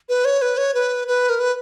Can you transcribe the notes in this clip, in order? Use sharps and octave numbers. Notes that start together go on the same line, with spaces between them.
B4
C#5
B4
C#5
B4
B4
A#4
B4